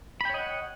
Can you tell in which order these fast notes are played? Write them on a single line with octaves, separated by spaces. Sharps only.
B5 G5 C#5 D#5 F#5